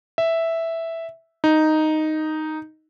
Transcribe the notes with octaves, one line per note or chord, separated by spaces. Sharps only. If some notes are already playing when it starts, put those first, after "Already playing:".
E5
D#4